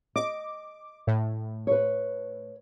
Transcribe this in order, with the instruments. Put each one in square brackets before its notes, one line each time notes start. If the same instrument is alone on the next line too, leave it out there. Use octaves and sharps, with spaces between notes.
[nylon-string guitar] D#5 [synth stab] D6
[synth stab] A2
[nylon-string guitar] B4 C#5